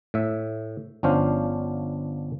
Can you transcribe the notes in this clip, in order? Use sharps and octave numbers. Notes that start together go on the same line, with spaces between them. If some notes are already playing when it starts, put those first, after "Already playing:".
A2 E5
G1 F3 C#4 D4 C5 F5